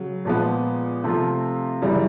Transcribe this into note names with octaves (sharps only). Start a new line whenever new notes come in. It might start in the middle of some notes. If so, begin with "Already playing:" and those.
Already playing: C#3 F#3
A#2 F3 G#3 B3
C3 F3 A3 C4 F4
F#2 C#3 E3 G3